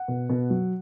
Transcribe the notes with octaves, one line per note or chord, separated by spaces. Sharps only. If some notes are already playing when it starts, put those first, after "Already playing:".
Already playing: F#5
B2
B2
F#3